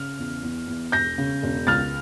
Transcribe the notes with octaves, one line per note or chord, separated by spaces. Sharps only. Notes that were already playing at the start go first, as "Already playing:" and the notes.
Already playing: C#3 F6
E2
E2
E2
E1 G6 A#6
C#3
E1
C#2 F6 A6